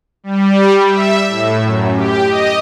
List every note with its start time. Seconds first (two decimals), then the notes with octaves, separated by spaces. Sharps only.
0.24 G3
0.86 E5
1.28 A2
1.63 F#2
1.94 G4
2.24 D#5